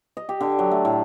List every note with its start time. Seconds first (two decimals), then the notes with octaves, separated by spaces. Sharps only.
0.17 D#5
0.29 G4
0.41 D3
0.59 F#3
0.71 A3
0.85 A2